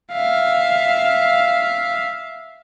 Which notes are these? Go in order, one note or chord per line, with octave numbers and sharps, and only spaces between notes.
E5 F5